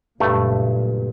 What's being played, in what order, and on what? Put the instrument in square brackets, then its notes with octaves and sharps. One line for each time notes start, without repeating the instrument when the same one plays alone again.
[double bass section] F#1 A#2 [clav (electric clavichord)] G2 A3